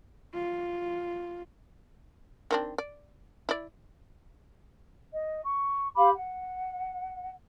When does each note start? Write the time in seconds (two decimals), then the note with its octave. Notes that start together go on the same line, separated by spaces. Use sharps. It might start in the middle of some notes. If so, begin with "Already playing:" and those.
0.34 F4
2.51 D#3 C4 D4
2.78 D5
3.49 E4 D5
5.13 D#5
5.44 C#6
5.95 G4 F5 B5 D6
6.13 F#5